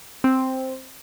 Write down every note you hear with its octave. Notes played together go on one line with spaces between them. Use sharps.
C4